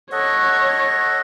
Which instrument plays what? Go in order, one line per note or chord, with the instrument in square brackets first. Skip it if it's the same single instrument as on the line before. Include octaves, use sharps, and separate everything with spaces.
[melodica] A4 D#5 F#5 [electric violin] C#5